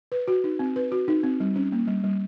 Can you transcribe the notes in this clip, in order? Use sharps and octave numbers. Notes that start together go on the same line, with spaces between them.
B4
F#4
D#4
C4
B4
F#4
D#4
C4
G3
C#4
A#3
G3
G3